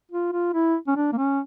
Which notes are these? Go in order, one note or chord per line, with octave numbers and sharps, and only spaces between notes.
F4
F4
E4
C#4
D4
A#3
C#4